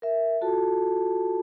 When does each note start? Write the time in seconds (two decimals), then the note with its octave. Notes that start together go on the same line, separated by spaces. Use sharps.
0.02 A#4 E5
0.41 F4 F#4 A4 A5